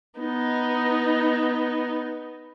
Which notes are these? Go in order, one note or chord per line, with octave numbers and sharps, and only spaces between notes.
B3 D#4